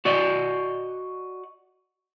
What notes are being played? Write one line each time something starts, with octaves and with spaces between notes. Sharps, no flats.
F#4 D5 D#5